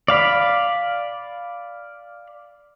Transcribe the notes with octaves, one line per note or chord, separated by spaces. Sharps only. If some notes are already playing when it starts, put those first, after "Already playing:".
D5 F5 B5